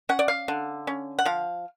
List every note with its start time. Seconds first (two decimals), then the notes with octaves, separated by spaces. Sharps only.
0.09 C#4 F#5
0.19 D5
0.28 F5
0.48 D3
0.87 C#4
1.19 F#5
1.25 F3 F5